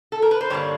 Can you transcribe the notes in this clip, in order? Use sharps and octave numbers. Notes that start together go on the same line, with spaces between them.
A4
A#4
B4
C5
G2 D3 G3 A#3 C#5